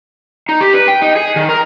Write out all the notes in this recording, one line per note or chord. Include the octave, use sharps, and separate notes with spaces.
D#4
G4
B4
G5
D#4
G#4
D#3
A#4